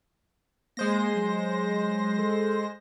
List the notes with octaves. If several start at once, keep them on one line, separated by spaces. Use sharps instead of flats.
G#3 A#3 C5 A#6
F#3
A4